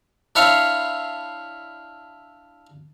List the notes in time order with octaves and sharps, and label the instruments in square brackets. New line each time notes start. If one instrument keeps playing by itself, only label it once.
[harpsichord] D4 E4 C#5 E5 F5 C6